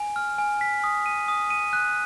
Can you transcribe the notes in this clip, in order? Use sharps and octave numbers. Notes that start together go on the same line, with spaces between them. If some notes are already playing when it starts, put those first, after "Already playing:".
Already playing: G#5
F6
G#5
B6
D#6
D#7
D#6
D#7
F#6